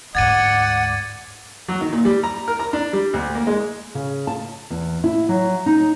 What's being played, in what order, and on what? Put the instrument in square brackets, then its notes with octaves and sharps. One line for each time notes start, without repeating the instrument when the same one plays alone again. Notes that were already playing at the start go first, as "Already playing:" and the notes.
[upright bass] D2 G#2 [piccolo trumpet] D5 [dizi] F#5 [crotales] G#6 A6 D#7
[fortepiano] F#3
D#3
A#2
G3
A#5
A#4
A#5
D4
G3
D2
A#3
G#3
[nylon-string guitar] C#3
A5
E2
E4
F#3
D#4